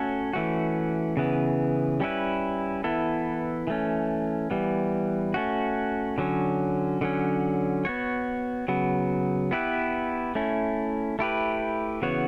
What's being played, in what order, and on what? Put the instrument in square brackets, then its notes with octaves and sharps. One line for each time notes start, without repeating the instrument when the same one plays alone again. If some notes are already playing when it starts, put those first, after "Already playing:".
Already playing: [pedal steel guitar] A3 C#4 F#4 A4 C#5
E3 A3 C#4 F#4
C#3 E3 B3
G3 C#4 E4 B4
E3 B3 E4 A4
E3 A3 C#4
E3 G3 B3
A3 C#4 F#4
D3 F#3 C#4
D3 F#3 C#4
B3 F#4 C#5
C#3 F#3 B3
B3 E4 G4 B4
A3 C#4 E4
A3 E4 G4 B4
C#3 E3 B3 F#4 C#5